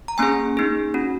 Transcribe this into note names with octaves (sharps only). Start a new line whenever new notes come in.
A#5
A#3 C#4 G#4 G#5
A#3 D#4 G#4
C#4 F#4